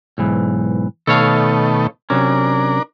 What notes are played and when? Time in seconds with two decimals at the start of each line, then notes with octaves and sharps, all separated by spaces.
0.18 B1 G#2 E3
1.07 B2 D#3 A3 A4 C#5 F5
2.10 C3 F#3 C#4 D4 A#4